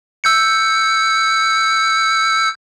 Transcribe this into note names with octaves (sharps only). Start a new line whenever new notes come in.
E6 G6 C#7